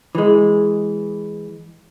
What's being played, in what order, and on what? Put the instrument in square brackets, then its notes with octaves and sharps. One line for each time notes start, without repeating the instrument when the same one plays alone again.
[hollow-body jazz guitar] E3 G#3